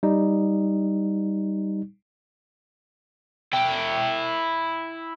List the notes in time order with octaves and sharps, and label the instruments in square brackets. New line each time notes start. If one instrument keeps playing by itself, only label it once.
[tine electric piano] G3 D#4
[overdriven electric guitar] E4 G5